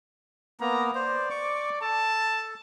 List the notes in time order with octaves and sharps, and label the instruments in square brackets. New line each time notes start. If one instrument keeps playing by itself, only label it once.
[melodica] A#3 B3 [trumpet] A#5
[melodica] C5 [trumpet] D5
[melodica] C#6 D6
[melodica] A4 [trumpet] A5